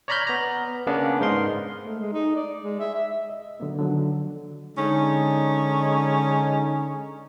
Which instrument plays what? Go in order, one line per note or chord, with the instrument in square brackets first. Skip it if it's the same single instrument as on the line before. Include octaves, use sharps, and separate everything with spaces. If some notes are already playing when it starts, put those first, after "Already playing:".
[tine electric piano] C#5 D5 A#5 B5 F6 G6
B3 A#5
C#3 A#3 B3 C#4 D4
G#2 D#4 A#4 C6
[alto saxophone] A3
G#3
D#4
D5
G#3
E5
E5
[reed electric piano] D#5
D3 F#3 A#3 B3
D3 D#3 F3 F#3
[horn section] D3 G#3 C#4 D#4